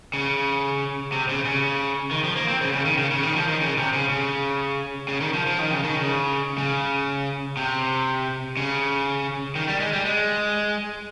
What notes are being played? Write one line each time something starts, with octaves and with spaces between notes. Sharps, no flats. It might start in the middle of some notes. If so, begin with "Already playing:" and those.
C#3
C3
C#3
C#3
D#3
F3
A#3
C4
C#3
C#3
D#3
C#3
C#3
D#3
F3
D#3
C#3
C3
C#3
C#3
C#3
D#3
F3
F3
D#3
C#3
D#3
C#3
C#3
C3
C#3
D#3
G3
G#3
G3
G#3